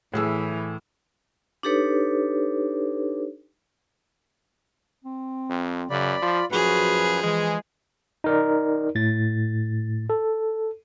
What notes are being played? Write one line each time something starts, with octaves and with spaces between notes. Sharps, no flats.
A2 E3 G#4 E6
D4 D#4 G4 A4 B4 C#5
C4
F2
F#2 C#3 D5 B5
F3 F4
F#2 F3 F#4 G#4 B4
E3 G#3
D#4 A#4 D5
A2 A6
A4